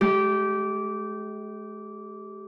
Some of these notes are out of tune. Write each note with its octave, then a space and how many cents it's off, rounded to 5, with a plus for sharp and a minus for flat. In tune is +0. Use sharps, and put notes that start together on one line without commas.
G#3 +45 G4 -20